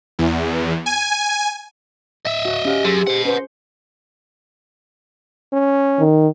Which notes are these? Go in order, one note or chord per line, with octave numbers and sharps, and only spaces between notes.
E2
G#5
D#5 E5
F#4 F#5
C#4 G4 F5 F#5
F#2 G#4 C6 E6
C5 D#5 F#5
C#4 B4 C5
C#4
D#3